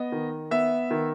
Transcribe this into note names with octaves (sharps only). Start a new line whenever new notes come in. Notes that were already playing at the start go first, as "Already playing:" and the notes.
Already playing: B3 D#5
D#3
B3 E5
D#3